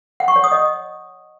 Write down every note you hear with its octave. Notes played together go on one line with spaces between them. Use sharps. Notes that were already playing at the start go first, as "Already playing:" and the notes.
F#5
C#6
C#5
D#6
D#5